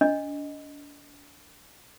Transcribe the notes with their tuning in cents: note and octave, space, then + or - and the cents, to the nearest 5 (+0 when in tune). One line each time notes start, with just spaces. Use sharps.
D4 -35 D#5 +0